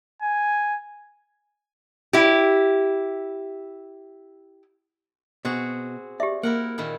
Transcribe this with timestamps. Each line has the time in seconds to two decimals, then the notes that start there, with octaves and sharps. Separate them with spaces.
0.22 G#5
2.13 E4 G4
5.45 B2 C4 F#4 G#4
6.20 G4 D5 E5
6.43 A#3 E4 A#4 F#5
6.78 A#2 D#3 E4